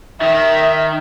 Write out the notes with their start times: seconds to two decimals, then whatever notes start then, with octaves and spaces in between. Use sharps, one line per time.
0.21 D#3 E5